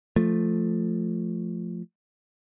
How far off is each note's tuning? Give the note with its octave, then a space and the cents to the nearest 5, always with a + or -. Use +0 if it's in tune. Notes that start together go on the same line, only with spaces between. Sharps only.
F3 +0 A3 +0